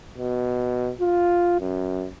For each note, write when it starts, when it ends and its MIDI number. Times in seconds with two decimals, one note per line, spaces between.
0.18 0.91 47
1.01 1.58 65
1.61 2.07 42